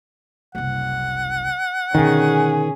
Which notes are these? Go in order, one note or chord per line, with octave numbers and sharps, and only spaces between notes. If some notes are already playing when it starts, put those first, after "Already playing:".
F#1 C2 F#5
B2 D3 D#3 C#4 G#4